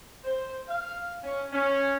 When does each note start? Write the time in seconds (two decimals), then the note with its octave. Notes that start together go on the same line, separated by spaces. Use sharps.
0.25 C5
0.69 F5
1.24 C#4
1.53 C#4